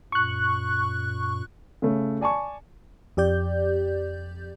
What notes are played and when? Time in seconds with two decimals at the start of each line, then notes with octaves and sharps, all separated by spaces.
0.12 F#2 A#2 C#6 F#6
1.82 C#3 A3
2.21 D5 G#5 A5 C#6
3.17 F2 G4 D5 G6